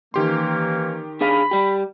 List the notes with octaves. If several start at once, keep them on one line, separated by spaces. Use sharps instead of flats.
D#3 E3 A#3 C#4 G4 C6
D4 G#4 F5 B5
G3 G4